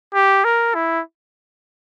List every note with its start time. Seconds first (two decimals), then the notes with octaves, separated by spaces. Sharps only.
0.15 G4
0.45 A#4
0.75 E4